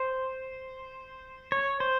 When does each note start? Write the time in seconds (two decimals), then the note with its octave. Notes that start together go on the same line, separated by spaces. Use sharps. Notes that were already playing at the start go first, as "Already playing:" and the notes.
Already playing: C5
1.52 C#5
1.80 C5